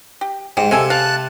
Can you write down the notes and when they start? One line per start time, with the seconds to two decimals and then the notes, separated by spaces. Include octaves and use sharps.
0.21 G4
0.57 G#2 G4
0.71 C3 A4 F5 G#5
0.90 F5 A5 F#6